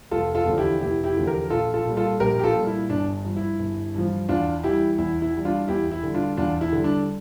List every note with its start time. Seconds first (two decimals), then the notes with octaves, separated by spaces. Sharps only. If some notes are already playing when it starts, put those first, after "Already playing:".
0.11 F1 F4 A4
0.35 F4 A4
0.46 E2 D3 F3
0.58 E4 G4
0.81 F1 E4 G4
1.04 E4 G4
1.16 E2 D3 F3
1.27 G4 A#4
1.50 A#1 F4 A4
1.74 F4 A4
1.85 A#2 G3
1.97 F4 A4
2.20 A#1 G4 A#4
2.39 G4
2.44 F4 A4
2.55 A#2 G3
2.67 E4
2.89 G1 D4
3.25 G2 F3
3.36 E4
3.59 G1
3.94 G2 F3
4.29 E2 D4 F4
4.64 E3 G3 E4 G4
4.98 E2 E4
5.22 E4
5.34 E3 G3
5.45 D4 F4
5.68 E2 E4 G4
5.91 E4
6.03 D3 G3
6.14 D4 F4
6.37 E2 D4 F4
6.61 E4
6.72 D3 G3
6.84 D4